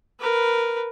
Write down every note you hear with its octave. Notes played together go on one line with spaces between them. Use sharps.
A#4 B4